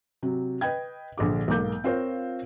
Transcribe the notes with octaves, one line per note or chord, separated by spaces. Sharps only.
C3 F#3
B4 D#5 G5 G#6
A#1 D3 D6
B1 G#2 A#3 D6 G6
C4 F4 A#4 C5 C#5